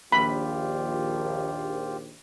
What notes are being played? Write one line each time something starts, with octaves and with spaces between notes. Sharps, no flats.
A#1 D#2 F4 G4 B5